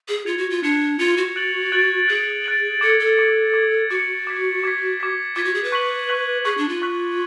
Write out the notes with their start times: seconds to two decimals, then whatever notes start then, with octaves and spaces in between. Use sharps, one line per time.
0.08 G#4
0.26 F4 G#6 C#7 F7
0.38 F#4
0.50 F4
0.63 D4 G#6 C#7 F7
0.99 F4 G#6 C#7 F7
1.17 F#4
1.36 F#6 A6 D7 F#7
1.72 F#6 A6 D7 F#7
2.08 G#4 F#6 A6 D7 F#7
2.44 F#6 A6 D7 F#7
2.81 A4 D6 G#6 C#7
2.99 A4
3.17 D6 G#6 C#7
3.54 D6 G#6 C#7
3.90 F#4 D6 G#6 C#7
4.27 D6 G#6 B6
4.64 D6 G#6 B6
5.00 D6 G#6 B6
5.36 F4 D6 G#6 B6
5.45 F#4
5.55 G#4
5.64 B4
5.72 C#6 F#6 B6 F#7
6.09 C#6 F#6 B6 F#7
6.45 G#4 C#6 F#6 B6 F#7
6.58 D4
6.69 F4
6.82 C#6 F#6 B6 F#7